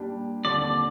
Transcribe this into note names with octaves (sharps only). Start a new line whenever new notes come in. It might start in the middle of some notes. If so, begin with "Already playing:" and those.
Already playing: A#2 G3 D4 G4
D#2 D3 F3 C4 D5